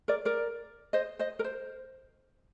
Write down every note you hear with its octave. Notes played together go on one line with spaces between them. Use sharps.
A#4 D5
A#4 D5
C5 D#5
C5 D#5
A#4
C5